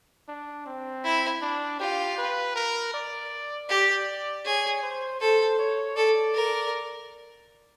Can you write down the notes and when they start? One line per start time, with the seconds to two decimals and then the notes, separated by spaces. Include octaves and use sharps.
0.28 D4
0.66 C4
1.04 E4
1.42 D4
1.80 F4 G4
2.18 B4
2.55 A#4
2.94 D5
3.69 G4 D5
4.45 G#4 C#5
4.83 C5
5.21 A4 C5
5.59 C#5
5.96 A4 D5
6.34 A#4